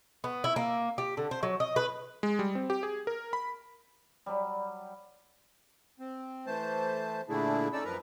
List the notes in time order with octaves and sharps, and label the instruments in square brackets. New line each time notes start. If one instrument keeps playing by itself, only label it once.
[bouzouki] B3
E4
A#3
G4
D3
C5
F#3
D#5
B4
[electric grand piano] G#3
G3
C4
G4
G#4
A#4
B5
[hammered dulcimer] F#3 G3
[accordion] C4
E3 A3 C5 A5
A#2 D3 A3 D4 E4 G#4
C#4 D#4 A4 D5 E6
F#2 F3 A#4 B4 A#5